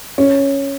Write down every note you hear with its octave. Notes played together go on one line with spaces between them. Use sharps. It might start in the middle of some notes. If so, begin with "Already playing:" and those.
C#4